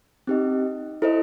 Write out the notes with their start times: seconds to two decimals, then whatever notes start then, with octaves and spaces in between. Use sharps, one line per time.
0.27 C4 D#4 G4 D#5
1.02 E4 A4 C5 D#5